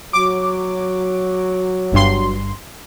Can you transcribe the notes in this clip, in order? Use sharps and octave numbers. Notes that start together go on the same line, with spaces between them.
F#3 D6
G1 G2 C6